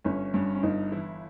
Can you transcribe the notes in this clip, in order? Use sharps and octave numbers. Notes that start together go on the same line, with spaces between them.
G1 C#4
G2 C#4
C#4
G1 D#4
E3 E4